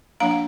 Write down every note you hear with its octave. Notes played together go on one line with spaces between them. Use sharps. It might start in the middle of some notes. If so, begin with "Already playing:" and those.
F3 A#3 D4 F5 A#5
F5